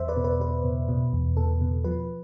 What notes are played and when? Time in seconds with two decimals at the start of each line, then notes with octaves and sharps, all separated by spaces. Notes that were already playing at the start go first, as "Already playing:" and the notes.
Already playing: E2 C5 E5
0.08 B4 D5
0.17 B2
0.24 B4 D5
0.40 B2 B4
0.64 B2
0.89 B2
1.13 E2
1.37 B2 A4
1.61 B2
1.84 F3 B4